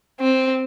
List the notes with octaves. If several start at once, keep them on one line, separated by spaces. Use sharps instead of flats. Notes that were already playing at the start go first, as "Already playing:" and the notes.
C4